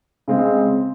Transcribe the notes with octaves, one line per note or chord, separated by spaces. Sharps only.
C#3 G#3 C4